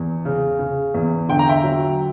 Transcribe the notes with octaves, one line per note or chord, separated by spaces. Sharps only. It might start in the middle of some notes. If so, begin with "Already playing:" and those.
Already playing: E2
C#3
C#3
E2
D3 G5
A#5
E5 G5
F#3